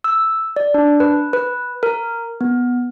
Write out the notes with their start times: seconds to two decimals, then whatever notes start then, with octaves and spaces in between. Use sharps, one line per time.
0.04 E6
0.56 D5
0.74 D4
1.00 B4
1.33 B4
1.83 A#4
2.41 B3